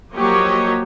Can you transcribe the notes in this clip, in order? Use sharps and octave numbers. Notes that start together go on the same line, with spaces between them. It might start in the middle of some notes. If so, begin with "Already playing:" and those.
F3 F#3 A#3 G4 C#5 D#5